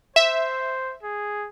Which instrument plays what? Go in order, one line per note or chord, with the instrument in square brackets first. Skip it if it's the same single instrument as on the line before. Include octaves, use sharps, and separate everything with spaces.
[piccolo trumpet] C5 [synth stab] E5
[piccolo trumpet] G#4